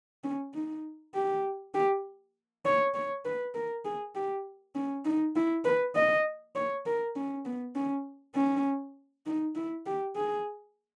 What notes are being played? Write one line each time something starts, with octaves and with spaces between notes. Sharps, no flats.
C#4
D#4
G4
G4
C#5
C#5
B4
A#4
G#4
G4
C#4
D#4
E4
B4
D#5
C#5
A#4
C#4
B3
C#4
C#4
D#4
E4
G4
G#4